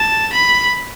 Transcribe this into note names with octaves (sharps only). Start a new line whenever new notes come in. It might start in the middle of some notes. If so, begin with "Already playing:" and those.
Already playing: A5
B5